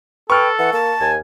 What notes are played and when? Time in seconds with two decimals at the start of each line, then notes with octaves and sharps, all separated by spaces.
0.30 A4 B4 G5 C#6 F6
0.59 E3 F#5
0.73 A#3 A5
1.00 D#2 G#5